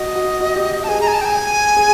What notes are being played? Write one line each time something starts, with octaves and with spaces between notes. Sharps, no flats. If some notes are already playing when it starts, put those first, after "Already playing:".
Already playing: F#4 D#5
F#4
F#4
G4
A5
G#4 G#5
A#5
G#5
A5
G5
G#5
G#4